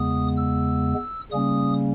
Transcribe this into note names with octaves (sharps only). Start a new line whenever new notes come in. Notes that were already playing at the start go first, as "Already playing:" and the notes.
Already playing: E2 C#3 G#3 B3 D#6
E6
C#3 G3 A#3 C#4 D#6